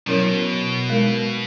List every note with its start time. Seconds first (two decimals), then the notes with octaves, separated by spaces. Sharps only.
0.06 B2 F#3 C#4 E4 A#4 C#5
0.90 G#3 D#4 A#4